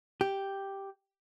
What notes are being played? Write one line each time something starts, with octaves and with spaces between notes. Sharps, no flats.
G4